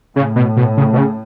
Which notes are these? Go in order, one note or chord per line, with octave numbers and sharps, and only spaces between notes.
A2 C#3
B2
B2
C#3
B2
C#3